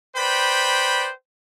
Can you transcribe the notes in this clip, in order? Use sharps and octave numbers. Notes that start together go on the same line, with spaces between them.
B4 C5 D5 G5 B5